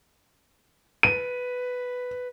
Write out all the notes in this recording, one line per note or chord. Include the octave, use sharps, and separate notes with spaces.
B4 D#7